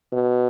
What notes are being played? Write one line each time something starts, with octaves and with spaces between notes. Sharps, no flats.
B2